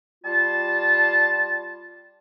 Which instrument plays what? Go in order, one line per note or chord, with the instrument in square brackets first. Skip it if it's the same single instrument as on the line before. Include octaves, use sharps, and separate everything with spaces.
[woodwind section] G3 F4 A5